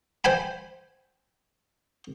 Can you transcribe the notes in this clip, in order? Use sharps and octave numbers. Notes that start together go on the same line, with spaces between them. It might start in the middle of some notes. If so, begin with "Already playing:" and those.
C5 G5 G#5 B5